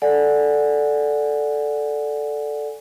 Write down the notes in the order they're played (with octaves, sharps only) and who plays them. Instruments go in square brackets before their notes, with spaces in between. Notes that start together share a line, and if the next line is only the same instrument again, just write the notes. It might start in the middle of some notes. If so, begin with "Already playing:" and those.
[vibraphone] A4 D5 F#5 G#5